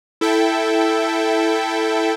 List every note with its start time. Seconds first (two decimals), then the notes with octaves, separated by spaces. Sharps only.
0.21 E4 A4 E5 G5